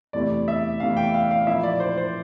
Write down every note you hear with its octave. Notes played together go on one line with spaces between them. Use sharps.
E2 C3 E3 A3 E4 D5
E5
E2 C3 E3 A3 E4 F5
G5
F5
F5
A#2 F3 A#3 E4 E5
D5
C5
C5